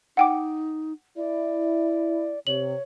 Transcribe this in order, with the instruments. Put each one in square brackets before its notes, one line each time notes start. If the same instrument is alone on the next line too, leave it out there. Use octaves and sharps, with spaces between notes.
[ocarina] D#4 [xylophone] F#5 G5 D6
[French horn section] E4 [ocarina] D5
[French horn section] C3 [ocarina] C#5 [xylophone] F#7